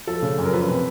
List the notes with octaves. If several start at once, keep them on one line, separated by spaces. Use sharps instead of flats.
F3 A4
C#3
F#2
A#4
F3 B4
C3